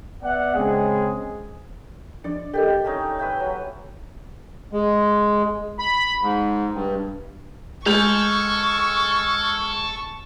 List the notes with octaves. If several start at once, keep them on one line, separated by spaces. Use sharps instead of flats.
B3 D5 E5 F#5
C#3 G#3 C4 G#4
F3 D4 D5
G4 A4 A#4 D#5 G5
A3 C#4 D#4
B4 E5 G5
F#3
G#3
B5
G#2
G2
G#3 A4 C#6 F6 G6 G#6 F7